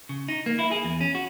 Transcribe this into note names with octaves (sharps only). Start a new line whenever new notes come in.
C#3
D#4
A#3
E4
G#4
E2
C#4
F#4